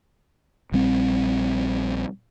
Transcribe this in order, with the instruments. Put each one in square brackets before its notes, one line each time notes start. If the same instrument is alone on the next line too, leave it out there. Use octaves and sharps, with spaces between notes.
[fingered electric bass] A#1 G3 C4